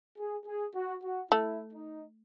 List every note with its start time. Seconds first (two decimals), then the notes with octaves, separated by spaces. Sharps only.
0.18 G#4
0.46 G#4
0.75 F#4
1.03 F#4
1.32 A3 E4
1.74 D#4